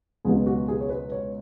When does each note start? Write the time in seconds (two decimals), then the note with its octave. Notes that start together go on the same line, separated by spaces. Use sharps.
0.25 C#2 B2 F#3 B3 G#4
0.46 F#4
0.68 G#4
0.81 C#5
0.89 B4
1.12 C#5